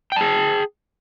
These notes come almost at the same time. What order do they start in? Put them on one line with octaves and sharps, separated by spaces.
G5 A5 G#4